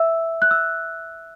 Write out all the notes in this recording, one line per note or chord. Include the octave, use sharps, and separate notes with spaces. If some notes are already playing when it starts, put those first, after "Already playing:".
Already playing: E5 E6
F#6
E6